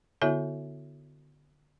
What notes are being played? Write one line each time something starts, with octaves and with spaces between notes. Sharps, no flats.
D3 B3 E4 F#4 C#5 E5